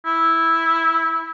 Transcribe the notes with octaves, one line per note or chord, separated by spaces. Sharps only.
E4